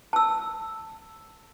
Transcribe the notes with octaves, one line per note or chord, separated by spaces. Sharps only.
A5 E6